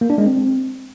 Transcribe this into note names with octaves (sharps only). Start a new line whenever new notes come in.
A#3
D4
G#3
C4